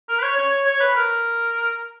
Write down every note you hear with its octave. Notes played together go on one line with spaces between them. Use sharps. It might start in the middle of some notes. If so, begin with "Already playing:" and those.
A#4
B4
C#5
C#5
C#5
C#5
B4
A#4